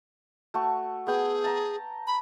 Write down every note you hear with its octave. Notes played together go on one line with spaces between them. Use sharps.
A3 F#4 C#6
B3 G#4 G5
A5 A#5
B5